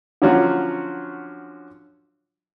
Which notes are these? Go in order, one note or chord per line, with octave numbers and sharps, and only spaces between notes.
D3 F3 F#3 C#4 F4 F#4